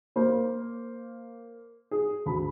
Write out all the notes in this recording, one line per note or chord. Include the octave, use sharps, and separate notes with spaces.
A#3 C5
G#4
D2 B5